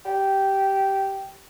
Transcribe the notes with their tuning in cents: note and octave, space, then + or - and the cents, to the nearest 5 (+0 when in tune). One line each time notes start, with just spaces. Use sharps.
G4 -10